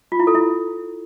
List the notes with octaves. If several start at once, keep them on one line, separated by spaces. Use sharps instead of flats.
F4
E4
A4
E4